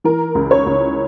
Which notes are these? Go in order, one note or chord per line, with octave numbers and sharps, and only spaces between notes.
E3 A#4
C#2
C#5
C#2